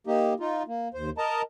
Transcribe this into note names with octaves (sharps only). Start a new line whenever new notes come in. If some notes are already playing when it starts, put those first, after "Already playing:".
A#3 D#4 G4
D#4 F4
A#3
D#2 C5
A#4 D#5 A5 A#5